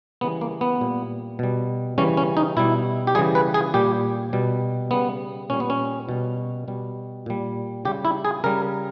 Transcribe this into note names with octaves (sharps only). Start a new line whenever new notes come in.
C#3 E3 G3 B3
A#3
B3
A#2 G3
B2 G3
C#3 E3 G3 C#4
C#4
D#4
B2 G3 E4
G4
C#3 E3 G3 G#4
B4
G#4
A#2 G3 G4
B2 G3
C#3 G3 B3
A#2 G3 C#4
B3
C#4
B2 G3
B2 G3
A#2 G3
C#3 G3 G4
E4
G#4
C#3 G3 A#4